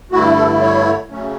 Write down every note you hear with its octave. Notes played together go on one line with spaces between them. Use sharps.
G2 D3 A3 E4 F#4
A4
C#5
C#3 F#3 A3 C#4